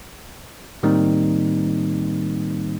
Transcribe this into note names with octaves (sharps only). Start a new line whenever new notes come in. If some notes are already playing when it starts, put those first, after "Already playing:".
A2 D#3 G3 A#3 C4 D#4